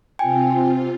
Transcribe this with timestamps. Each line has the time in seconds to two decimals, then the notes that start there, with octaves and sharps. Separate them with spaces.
0.19 C3 C4 F4 G5 G#5